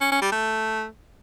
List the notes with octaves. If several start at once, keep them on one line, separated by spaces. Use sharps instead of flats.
C#4
C#4
G3
A3